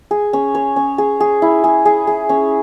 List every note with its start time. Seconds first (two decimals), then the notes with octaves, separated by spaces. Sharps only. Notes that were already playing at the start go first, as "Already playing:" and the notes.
0.11 G#4
0.33 C#4
0.55 C#5
0.76 C#4
0.98 G#4
1.20 G#4
1.42 E4
1.64 G#4
1.85 G#4
2.07 G#4
2.29 C#4